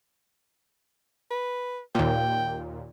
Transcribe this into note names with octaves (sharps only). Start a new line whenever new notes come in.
B4
D#2 A#2 G5